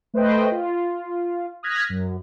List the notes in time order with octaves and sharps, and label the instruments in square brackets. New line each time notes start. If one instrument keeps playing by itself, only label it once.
[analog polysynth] A3 B4 C5 D#5 G5
F4
D#6 F6 F#6 G#6 A#6 B6
F#2